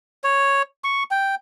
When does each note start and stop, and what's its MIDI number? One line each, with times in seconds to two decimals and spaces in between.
0.24 0.62 73
0.84 1.03 85
1.11 1.35 79